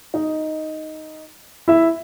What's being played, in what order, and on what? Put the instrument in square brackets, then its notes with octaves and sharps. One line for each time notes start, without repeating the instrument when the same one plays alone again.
[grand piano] D#4 D#5
E4 E5